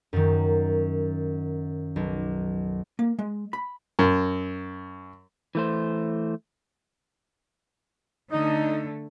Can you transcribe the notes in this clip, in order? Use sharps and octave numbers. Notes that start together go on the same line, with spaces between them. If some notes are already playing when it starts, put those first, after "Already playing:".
F#2 D#3
B1
A#3
G#3
B5
F#2
E3 A3 C5
D3 A3 D#4